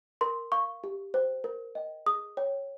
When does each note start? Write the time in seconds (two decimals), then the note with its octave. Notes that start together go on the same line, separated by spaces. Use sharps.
0.21 A#4 C6
0.52 F5 C#6
0.84 G4
1.14 C5 G5
1.44 A#4
1.75 D#5 G5
2.06 G#4 D#6
2.37 C#5 G5